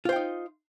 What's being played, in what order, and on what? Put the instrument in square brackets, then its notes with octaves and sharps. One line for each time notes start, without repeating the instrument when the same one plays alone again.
[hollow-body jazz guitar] F4
C5
G5
D#4